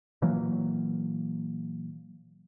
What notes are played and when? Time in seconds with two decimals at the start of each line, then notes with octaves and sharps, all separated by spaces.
0.22 A#2 E3 F#3 A#3